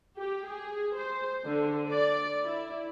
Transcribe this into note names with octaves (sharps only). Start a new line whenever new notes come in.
G4
G#4
C5
D3
D5
E4